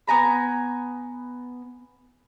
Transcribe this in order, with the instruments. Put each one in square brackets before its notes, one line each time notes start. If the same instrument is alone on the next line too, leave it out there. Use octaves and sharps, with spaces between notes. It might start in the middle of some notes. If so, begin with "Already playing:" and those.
[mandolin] B3 G#5 A#5 B5